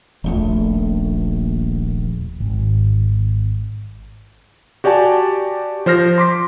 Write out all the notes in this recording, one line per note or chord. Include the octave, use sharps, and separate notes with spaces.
D#1 A#1 A3
G#1
F#4 G4 D5 G#5 A5
F3 C5 F6 A#6
C6 D6 B6